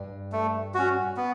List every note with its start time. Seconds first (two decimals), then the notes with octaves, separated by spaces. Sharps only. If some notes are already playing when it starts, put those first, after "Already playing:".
Already playing: G2
0.32 A3
0.74 C#4 F#4
1.17 B3